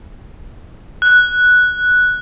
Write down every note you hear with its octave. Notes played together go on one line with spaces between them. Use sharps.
F#6